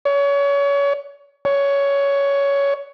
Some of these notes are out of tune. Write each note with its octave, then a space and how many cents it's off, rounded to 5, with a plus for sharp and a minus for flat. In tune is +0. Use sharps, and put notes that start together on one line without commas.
C#5 +30
C#5 +15